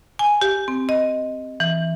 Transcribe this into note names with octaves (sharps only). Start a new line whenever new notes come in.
G#5
G4
C4
D#5
E3